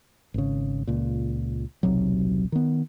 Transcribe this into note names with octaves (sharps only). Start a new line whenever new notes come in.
G#1 C#3
C#2 A#2
D#1 B1 C3 F#3
D#3 B3